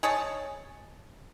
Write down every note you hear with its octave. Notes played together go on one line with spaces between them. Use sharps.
G#4 C#5 D#5 A5